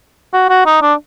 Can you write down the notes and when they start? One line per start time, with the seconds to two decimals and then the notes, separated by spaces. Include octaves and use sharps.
0.33 F#4
0.50 F#4
0.66 D#4
0.82 D4